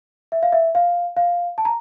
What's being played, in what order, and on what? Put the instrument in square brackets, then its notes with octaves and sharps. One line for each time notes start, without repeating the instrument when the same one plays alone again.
[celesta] E5
F5
E5
F5
F5
A5
A#5